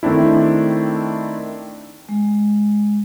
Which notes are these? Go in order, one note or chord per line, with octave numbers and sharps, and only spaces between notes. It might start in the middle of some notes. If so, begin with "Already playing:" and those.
D#3 A3 C4 D4 E4
G#3